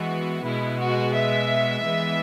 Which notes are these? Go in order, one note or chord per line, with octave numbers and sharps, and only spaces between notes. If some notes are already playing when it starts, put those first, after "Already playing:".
Already playing: E3 G#3 B3 F#4
B2 G#3 B3 E4
F#4
E5
E3 G#3 B3